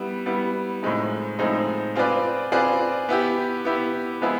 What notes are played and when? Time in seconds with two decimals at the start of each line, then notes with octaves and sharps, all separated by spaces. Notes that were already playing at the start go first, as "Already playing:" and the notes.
Already playing: G3 B3 E4
0.26 G3 B3 E4
0.83 A2 F3 G#3 C4 D#4
1.39 A2 F3 G#3 C4 D#4
1.96 C4 F4 G#4 B4 D5
2.52 C4 F4 G#4 B4 D5
3.09 B3 E4 G4
3.65 B3 E4 G4
4.22 F3 G#3 B3 E4 G#4